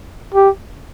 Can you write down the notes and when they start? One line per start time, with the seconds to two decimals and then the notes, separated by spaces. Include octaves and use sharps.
0.35 G4